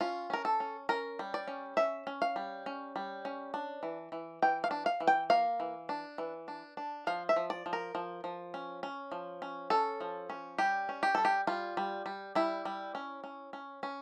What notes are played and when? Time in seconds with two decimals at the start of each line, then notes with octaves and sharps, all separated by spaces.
0.01 C#4 F4
0.30 C#4 A#4
0.45 A4
0.60 C#4
0.89 C#4 A#4
1.19 G3
1.34 D5
1.47 C#4
1.77 C#4 E5
2.07 C#4
2.22 F5
2.36 G3
2.66 C#4
2.96 G3
3.25 C#4
3.54 D4
3.83 E3
4.12 E3
4.42 E3 G5
4.64 F5
4.71 D4
4.86 F5
5.00 E3
5.07 G5
5.30 A#3 F5
5.60 E3
5.89 D4
6.18 E3
6.48 D4
6.77 D4
7.07 F3 F5
7.29 E5
7.36 F3
7.50 D5
7.66 F3
7.73 A#4
7.95 F3
8.24 F3
8.54 C#4
8.83 C#4
9.12 F3
9.42 C#4
9.70 C#4 A4
10.01 F3
10.30 C#4
10.58 G3 G4
10.89 C#4
11.03 G4
11.15 G3 A4
11.25 G4
11.47 G3 F4
11.77 G3
12.06 G3
12.35 G3 E4
12.65 G3
12.95 C#4
13.24 C#4
13.53 C#4
13.83 C#4